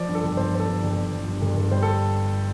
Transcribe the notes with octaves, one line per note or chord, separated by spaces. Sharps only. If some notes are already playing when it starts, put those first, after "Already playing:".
Already playing: F3 D5
G2
A4
G1
G1 C5
F3 C5
A4
G2
G1
G1
F3
G2
G1
G1
G3 C5
A4